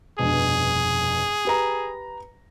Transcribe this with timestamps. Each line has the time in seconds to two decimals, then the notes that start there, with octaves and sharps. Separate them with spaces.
0.19 F1 G2 B2 G#4
1.45 G4 B4 A#5